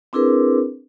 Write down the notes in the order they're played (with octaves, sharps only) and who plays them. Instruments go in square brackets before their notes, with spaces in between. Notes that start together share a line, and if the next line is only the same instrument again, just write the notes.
[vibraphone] C4 D4 E4 G#4 A#4 B4